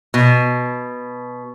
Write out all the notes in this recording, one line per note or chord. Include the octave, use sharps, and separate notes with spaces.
B2